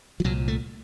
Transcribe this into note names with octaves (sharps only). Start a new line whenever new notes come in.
F3
C2 A#2 F#3
A3